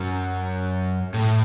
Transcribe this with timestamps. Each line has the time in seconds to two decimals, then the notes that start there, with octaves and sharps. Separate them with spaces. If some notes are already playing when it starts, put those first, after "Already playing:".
Already playing: F#2
1.14 A2